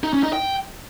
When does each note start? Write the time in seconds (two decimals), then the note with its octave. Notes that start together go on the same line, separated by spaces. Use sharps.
0.03 D#4
0.13 C#4
0.23 D#4
0.33 G5